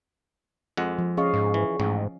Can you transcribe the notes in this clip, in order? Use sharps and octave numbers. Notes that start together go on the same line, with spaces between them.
F2 G#3 F#5
F3
C#4 G#4 D#5 F5 C#6
G#2
E3
A1 G#2